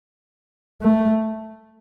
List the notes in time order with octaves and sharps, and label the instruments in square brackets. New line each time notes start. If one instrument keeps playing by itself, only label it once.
[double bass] A3